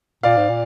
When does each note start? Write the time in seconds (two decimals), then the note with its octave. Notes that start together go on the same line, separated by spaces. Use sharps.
0.23 A#2 D5 F5
0.37 G#2
0.49 A#2